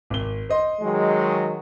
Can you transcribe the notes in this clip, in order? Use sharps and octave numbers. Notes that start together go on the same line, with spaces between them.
G#1 G7
C5 D#5 C6
D#3 F#3 G#3